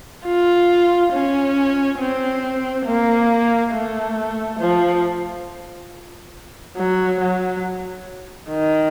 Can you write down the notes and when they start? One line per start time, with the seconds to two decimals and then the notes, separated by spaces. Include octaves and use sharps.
0.25 F4
1.12 C#4
1.99 C4
2.85 A#3
3.72 A3
4.59 F3
6.77 F#3
7.20 F#3
8.50 D#3